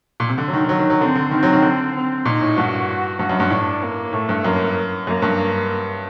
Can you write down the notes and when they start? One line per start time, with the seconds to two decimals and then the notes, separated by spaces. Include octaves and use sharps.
0.20 A#2
0.29 C3
0.38 D3
0.48 F#3
0.53 D#3
0.64 D#3
0.69 F#3
0.79 D#3
0.90 F#3
1.00 D3 C4
1.15 D3
1.31 D#3 C4
1.43 F#3
1.53 D#3
1.62 D3
1.94 C4
2.25 A#2 D#4
2.41 A2
2.57 G2 F#4
3.19 G2 F#4
3.29 F#2
3.40 G2
3.50 A2 D4
3.82 A#3
4.13 A2 A3
4.29 G2
4.45 F#2 A#3
5.07 F#2 A#3
5.22 G2